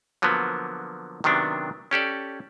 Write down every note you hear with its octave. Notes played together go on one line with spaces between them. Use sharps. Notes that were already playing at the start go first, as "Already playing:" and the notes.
D3 F3 F#3 A#3 B3
C3 D#3 F#3 B3 D4
C#4 G4 A4 D5